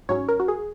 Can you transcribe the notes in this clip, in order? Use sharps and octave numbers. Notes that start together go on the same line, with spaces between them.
G#2 F#3 C#4 C#5
A#4
F#4
G#4